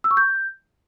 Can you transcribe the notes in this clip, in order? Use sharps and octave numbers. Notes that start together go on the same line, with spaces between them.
E6
C#6
G6